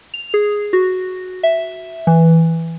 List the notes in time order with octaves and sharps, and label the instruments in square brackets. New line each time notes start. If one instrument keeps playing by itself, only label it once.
[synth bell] F7
G#4
F#4
E5
E3